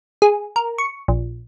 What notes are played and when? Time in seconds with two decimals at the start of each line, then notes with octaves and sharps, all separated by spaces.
0.22 G#4
0.56 A#4
0.78 C#6
1.08 A#1